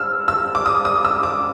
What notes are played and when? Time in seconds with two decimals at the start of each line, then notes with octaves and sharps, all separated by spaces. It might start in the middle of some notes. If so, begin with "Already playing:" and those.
Already playing: E6 F6
0.28 E6
0.55 D6
0.66 D#6
0.85 D#6
1.05 E6
1.23 D6